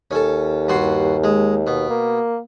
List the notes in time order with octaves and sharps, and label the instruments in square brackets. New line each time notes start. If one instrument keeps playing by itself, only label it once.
[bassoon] D#2 [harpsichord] C#4 A4
[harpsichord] G2 F#4 C6
G#3
B2
[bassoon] A#3